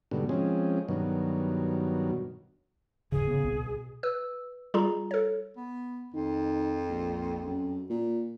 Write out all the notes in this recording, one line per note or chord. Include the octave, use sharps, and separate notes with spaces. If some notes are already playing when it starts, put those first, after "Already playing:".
G#2 B2 D3 G3
F3 G#3 C4 C#4
G2 B2 D#3 F#3
D#1 G#2 C#3 G#4
C#3 B3
C2 B2
B2
B4 E6
G3 F4 G#4 A#5
A4 C#5
B3
F2 D#3
A#1
F#2
A#2